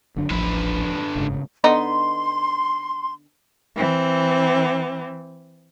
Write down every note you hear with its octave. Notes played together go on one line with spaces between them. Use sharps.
F#1 D3 F#3 D4
D#1 A1 D3 F3 B4
F#1 G#2 C#3
D3 B3 D#4 C6
E3 C4